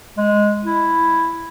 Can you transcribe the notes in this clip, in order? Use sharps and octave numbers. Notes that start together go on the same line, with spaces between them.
G#3
E4